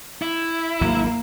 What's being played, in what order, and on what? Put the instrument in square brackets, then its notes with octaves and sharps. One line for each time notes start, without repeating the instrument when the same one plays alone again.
[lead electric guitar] E4
[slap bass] G#1 D2 F#3 [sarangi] A#3